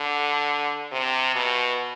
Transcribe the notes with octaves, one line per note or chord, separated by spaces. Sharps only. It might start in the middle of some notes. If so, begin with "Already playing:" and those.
Already playing: D3
C3
B2